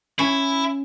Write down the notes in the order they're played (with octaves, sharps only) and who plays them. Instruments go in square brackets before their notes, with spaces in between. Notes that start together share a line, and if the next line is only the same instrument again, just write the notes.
[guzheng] C#4 [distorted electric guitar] E4